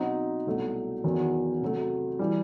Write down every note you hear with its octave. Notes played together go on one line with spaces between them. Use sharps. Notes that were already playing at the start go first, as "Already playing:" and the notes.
Already playing: B2 F#3 C4 D#4 F#4
C2 B2 F#3 A3
E2 D#3 F#3
C3 F#3 A3
E3 G3